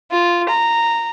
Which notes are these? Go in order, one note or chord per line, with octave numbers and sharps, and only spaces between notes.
F4
A#5